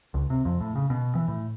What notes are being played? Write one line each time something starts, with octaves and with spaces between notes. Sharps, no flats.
C#2
C3
F2
A2
C#3
B2
E3
A2